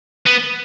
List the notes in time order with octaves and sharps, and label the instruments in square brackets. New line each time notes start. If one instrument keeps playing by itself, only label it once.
[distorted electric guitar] B3